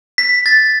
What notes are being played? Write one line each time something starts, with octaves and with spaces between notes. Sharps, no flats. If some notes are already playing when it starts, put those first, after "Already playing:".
B6
A6